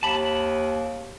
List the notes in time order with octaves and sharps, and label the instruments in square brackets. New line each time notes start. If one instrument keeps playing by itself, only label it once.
[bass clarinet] D#2 [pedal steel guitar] A5 B5